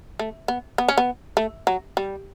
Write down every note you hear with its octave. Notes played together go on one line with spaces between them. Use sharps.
A3
B3
B3
C#4
B3
A3
F#3
G3